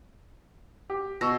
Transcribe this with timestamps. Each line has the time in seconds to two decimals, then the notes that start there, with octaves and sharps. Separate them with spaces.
0.90 G4
1.21 B2 C#6 E6 A#6